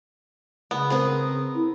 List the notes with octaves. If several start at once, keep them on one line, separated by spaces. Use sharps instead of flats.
C#3 B3
B3 C4 G#4 A#4
E4